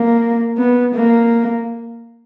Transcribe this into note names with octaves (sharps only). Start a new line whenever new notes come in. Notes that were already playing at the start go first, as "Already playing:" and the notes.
Already playing: A#3
B3
A#3